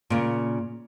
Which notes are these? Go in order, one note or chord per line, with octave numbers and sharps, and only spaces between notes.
A#2 C#3